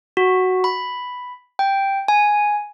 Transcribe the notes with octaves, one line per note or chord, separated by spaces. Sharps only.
F#4
B5
G5
G#5